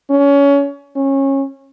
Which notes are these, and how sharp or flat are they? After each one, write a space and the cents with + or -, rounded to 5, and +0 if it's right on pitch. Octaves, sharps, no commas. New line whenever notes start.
C#4 +25
C#4 -25